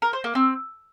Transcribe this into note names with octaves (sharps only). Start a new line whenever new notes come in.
A#4
C5
A#3
C4